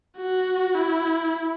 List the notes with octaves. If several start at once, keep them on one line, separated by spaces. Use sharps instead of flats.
F#4
E4